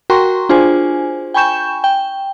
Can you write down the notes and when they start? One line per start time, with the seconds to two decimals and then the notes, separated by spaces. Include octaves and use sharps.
0.10 F#4 A#4 G5 A#5 C6 C#6
0.49 D4 F4 G#4 C5 G#5
1.34 G5 G#5 B5 C#6 G6 E7
1.84 G5